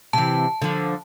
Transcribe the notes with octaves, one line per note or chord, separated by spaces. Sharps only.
C3 E3 A5
D3 F3